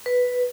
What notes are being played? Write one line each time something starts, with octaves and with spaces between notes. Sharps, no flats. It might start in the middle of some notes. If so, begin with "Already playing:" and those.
B4